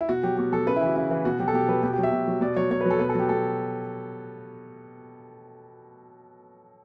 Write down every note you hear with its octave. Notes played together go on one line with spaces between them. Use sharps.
E4
B2 F#4
F#3 G4
B2 G4
F#3 A4
C#3 B4
E4
E3
F#4
C#3 E4
E3
B2 F#4
F#3 G4
A4
B2 G4
F#3 B4
B2 G4
G4
F#3
E5
B2
F#3
B2 D5
F#3 C#5
B2 C#5
B4
F#3
A4
B2 B4
A4
F#3 G4
B2 A4